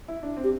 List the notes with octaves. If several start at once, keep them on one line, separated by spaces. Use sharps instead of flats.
E4
D4
C4
G4